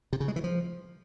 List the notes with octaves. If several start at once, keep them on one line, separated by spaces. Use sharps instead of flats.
C3
C#3
G#3
E3
F3